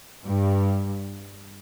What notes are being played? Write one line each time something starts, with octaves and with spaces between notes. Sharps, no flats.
G2